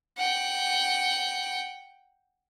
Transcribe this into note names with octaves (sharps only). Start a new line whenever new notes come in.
F#5 G5